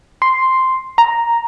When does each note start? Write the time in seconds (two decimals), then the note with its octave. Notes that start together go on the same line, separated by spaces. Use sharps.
0.22 C6
0.98 A#5